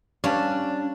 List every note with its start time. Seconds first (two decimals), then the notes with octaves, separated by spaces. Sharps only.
0.24 G3 C#4 D4 C#5 F5 A5